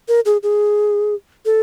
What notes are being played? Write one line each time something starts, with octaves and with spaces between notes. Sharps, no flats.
A#4
G#4
G#4
A4